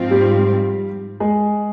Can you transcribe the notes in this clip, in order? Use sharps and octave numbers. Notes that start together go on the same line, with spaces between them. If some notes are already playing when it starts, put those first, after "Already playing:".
Already playing: G#2 F3 C4 F4
G3 G4
G#3 G#4